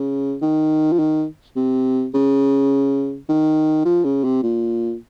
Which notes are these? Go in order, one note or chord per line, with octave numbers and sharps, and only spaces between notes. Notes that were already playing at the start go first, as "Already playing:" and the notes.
Already playing: C#3
D#3
F3
D#3
C3
C#3
D#3
F3
C#3
C3
A#2